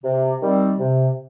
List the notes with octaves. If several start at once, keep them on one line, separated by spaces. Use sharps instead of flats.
C3
D#3 G3 C4
C3